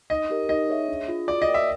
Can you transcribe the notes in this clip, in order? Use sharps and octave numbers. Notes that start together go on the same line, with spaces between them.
D#4 D#5
G4 A#4
D#4 D#5
G#4 C#5 E5
D4
F4 G#4
F#4 D5
D#5
A#4 D5 G5
E5